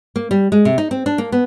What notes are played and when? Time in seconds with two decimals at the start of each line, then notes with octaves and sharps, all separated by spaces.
0.16 A#3
0.31 G3
0.52 G#3
0.65 C3
0.78 D#4
0.91 C4
1.06 D4
1.18 A#3
1.32 B3